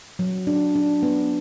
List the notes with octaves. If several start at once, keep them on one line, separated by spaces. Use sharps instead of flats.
F#3
D4
D4
B3